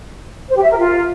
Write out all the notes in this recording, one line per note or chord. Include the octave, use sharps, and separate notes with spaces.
C5
G4
E5
A#4
F4